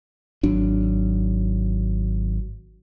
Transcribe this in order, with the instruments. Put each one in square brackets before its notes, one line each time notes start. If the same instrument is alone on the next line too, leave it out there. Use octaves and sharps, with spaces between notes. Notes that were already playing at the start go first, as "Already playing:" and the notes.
[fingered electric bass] G#1 F#3 D4